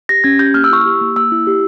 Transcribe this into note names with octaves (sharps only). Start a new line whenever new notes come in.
G4 A#6
C#4 G#6
G4 G6
A#3 F6
E6
E4 C#6
G4 E6
A#3
A#3 E6
E4
G4